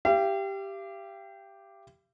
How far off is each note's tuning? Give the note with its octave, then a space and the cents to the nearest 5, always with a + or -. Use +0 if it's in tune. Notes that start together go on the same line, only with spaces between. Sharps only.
G4 +0 F5 -45